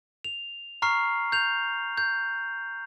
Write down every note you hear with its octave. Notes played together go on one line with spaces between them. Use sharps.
F7
A#5 C#6 F6 C7
G6 F7
G6